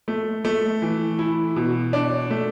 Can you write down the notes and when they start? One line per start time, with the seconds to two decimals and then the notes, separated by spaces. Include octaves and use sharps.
0.08 A3
0.45 A3
0.82 E3
1.19 E4
1.56 B2
1.93 D4
2.30 A3